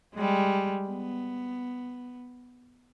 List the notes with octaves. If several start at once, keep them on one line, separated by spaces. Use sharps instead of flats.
G3 G#3
B3